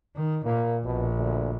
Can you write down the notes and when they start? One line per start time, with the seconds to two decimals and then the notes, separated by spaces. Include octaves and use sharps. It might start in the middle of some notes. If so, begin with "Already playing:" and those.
0.16 D#3
0.46 A#2 A#3
0.85 A#1 B2
1.18 D2